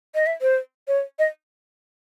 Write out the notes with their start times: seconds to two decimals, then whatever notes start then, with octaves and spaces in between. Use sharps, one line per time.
0.15 D#5
0.26 E5
0.42 C5
0.88 C#5
1.19 D#5